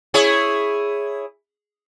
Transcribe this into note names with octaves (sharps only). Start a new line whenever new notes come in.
E4 G#4 C#5